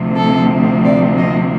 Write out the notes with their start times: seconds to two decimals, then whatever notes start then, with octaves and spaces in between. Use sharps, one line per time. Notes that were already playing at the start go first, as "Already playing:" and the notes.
Already playing: D2 C3 F3 A3 C4
0.16 A4
0.85 D5
1.18 D#5